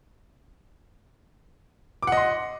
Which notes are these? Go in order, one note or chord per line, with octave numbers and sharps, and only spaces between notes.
D#5 F#5 C6 D6